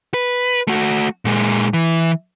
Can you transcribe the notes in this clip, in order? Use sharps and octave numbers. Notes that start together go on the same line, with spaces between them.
B4
A3 F#4
A#2 G#3
E3